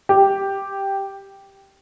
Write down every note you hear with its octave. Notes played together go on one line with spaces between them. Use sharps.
G4